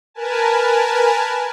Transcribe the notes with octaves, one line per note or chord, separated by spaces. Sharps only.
A#4 B4 G#5 A5